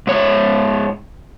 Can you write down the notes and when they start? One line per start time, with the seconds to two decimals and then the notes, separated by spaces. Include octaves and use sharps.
0.07 G#2 C#5